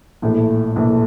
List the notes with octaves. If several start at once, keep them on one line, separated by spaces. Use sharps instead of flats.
A#1 A2 E3 A3
A#1 A2 E3 A3